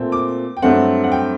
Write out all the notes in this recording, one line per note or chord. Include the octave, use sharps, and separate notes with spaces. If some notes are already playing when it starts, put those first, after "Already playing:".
Already playing: A#2 A3 C4
D6
G5
G2 F#3 A3 C4 F#5
F#5
G5